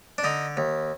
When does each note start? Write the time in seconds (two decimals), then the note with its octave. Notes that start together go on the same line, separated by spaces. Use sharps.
0.18 D4
0.24 D3 D#4
0.57 D#2